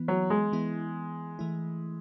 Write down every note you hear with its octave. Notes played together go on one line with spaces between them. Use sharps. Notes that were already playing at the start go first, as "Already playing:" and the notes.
Already playing: E3 B3 E4
F#3
G#3
E3 B3 E4
E3 A3 E4